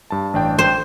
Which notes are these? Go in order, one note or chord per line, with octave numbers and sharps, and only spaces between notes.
G2 A5
A1 D4 G5
C5